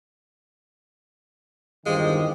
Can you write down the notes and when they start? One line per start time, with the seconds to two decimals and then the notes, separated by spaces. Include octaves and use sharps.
1.86 E2 G2 D#3 G#3 F4 G4 C5